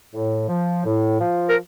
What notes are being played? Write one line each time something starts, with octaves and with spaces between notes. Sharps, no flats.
A2
F3
A2
F3
A#4